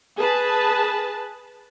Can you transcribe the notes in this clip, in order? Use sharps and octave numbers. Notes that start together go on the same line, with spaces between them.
G#4 B4 A5